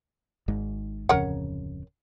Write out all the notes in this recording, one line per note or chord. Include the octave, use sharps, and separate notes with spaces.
G#1 G#2
D1 F2 C#3 A#4 C#5 F#5